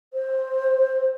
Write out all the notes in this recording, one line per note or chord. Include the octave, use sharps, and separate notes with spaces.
C5